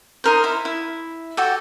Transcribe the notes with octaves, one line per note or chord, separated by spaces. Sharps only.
D#4 A#4 C5
E4
E4
F#4 G4 A4